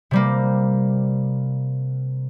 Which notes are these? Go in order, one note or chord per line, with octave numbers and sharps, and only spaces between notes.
C3 G3 A#3